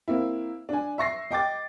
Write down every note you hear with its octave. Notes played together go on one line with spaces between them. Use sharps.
A#3 C4 E4
D4 G#5
E5 C#6 A#6 C7
D#5 G5 D6 A6